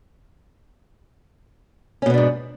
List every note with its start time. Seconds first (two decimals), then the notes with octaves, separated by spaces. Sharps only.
2.02 C#4
2.06 B2
2.10 B3
2.14 D4
2.18 G#2